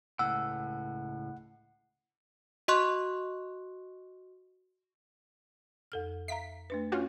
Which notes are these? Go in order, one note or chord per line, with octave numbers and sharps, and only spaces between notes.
C#2 A2 F#5 E6
F#4 D#5 C6 C#6 F#6
F2 A4 F6
E5 F5 A#5 B6
A3 D4 B4
C#4 F4 F#4